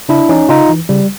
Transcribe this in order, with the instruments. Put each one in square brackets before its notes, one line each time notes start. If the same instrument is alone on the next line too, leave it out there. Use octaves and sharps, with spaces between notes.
[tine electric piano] C#3 D4 E4
E3 C#4 D#4
C#3 D#4 F4
E3
C#3 G3